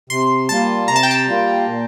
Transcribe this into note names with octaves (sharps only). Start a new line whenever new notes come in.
C3 C6
G3 A#3 F4 A5
C3 A#5
A5
G5
A5
G3 A#3 F4
A#2